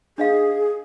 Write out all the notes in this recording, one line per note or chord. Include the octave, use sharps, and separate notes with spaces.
D4 G#4 D#5 F5